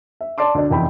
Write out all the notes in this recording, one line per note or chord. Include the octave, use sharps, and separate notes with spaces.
E5
D5 A5 C6 D6
D2 D4
F1 E2 E4 G5 B5